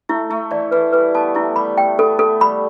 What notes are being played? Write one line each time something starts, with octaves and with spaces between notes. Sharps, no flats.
A3 E4
A3 E4
E3 D5
E3 B4
G3 B4
B3 A5
A3 E4
G3 B5
A3 G5
B3 A4
A3 A4
G3 B5